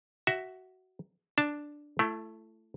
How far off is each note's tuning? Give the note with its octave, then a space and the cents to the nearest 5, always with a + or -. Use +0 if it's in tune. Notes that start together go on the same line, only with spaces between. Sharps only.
F#4 +15 E5 +0
D4 +0 A5 +0
A3 +0 E4 +40